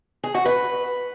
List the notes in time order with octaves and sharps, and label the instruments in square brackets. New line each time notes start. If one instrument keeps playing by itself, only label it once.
[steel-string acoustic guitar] G#4
F#4
B4